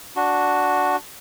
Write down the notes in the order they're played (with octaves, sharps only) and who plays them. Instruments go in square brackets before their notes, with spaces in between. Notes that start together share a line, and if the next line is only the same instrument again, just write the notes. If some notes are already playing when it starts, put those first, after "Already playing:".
[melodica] D4 F#4